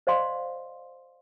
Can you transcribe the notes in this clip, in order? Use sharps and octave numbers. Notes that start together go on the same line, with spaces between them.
C5 D5 D#5 F5 C6